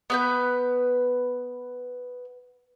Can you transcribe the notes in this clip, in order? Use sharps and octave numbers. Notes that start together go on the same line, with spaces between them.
B3 B4 G6